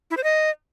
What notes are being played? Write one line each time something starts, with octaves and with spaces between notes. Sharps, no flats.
E4
C5
D#5